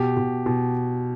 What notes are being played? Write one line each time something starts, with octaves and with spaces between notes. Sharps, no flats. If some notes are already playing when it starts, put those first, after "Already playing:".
Already playing: B2 G4
B2
B2